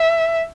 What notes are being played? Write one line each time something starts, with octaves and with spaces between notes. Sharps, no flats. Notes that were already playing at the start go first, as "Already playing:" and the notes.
Already playing: E5